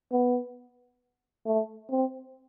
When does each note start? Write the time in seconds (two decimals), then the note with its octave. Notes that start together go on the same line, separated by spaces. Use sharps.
0.12 B3
1.46 A3
1.91 C4